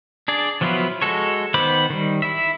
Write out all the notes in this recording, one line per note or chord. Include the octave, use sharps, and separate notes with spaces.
D4 G#4 D5
F3 F#3 B3 E4 F4
G#3 F#4 A4 C#5
D#3 B3 C5 B5 D6
D#3 G3
E4 E5